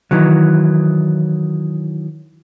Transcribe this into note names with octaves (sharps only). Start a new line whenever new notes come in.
D#3 E3 F#3